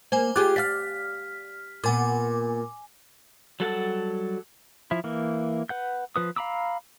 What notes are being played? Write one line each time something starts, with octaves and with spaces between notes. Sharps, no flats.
A#3 C5 G#5
F4 G4 G#4 D6 F#6
D5 F5 F6 B6
A#2 B3 G#5 D6
F#3 G3 A4 F#5 A5
F3 E4
E3 A#3
B4 F#5 G6
F3 B4 D#6
F5 A#5 B5 D6 E6